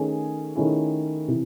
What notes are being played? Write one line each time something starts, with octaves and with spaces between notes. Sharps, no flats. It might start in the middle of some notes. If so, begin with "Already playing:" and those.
Already playing: D#3 A3 C#4 G#4
D#3 A3 C#4 E4 G#4
C3 E3